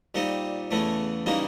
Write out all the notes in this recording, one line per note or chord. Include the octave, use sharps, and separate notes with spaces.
A#2 G3 C4 D#4
E2 C#3 E3 A3
C#3 E3 G3 A#3 D#4